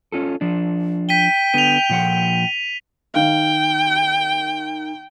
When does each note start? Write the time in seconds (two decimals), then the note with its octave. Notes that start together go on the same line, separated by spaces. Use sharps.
0.12 C#4 F4 A4
0.41 F3 D4
1.09 G5 B6 D#7 G7
1.54 D3 B3 D#7 F7
1.89 A#2 F3 F#5
3.14 D#3 F5 G5